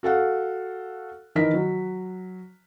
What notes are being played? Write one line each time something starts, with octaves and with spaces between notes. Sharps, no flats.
F#4 A4 F5 F#5
D#3 E3 A#4 D#5 B6
F#3